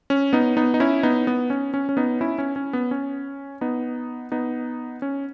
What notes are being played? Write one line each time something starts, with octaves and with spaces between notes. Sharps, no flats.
C#4
B3 D#4
B3 D#4
D#4
C#4 E4
B3 D#4
B3
C#4
C#4
C#4
B3 D#4
C#4 E4
C#4
C#4
B3
C#4
B3 D#4
B3 D#4
C#4